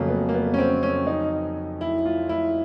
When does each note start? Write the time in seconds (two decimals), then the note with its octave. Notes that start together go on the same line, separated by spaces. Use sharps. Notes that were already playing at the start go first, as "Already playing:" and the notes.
Already playing: F2 C#3 F#3 A3 A#3
0.09 B3
0.29 A#3
0.34 B3
0.54 C#4
0.58 C4
0.83 C#4
1.07 D#4
1.81 E4
2.06 F4
2.29 E4